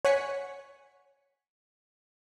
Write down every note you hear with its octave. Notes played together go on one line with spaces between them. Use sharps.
C#5 F#5 G#5 B6 C#7